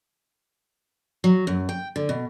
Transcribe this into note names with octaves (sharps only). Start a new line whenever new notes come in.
F#3
F#2
G5
D3
B2